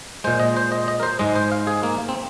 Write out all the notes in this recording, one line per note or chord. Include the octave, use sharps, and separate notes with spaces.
A#2 G#3 C5
D#5
C5
D#5
D#5
A#4
C5
G#2 G#3 D#5
C5
F5
G#4
A#3
C4